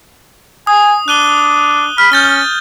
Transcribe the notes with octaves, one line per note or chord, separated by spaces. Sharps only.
G#5 D#6
D4 F#6 D#7 G7
B5 F6
C#4 G6 A6 G7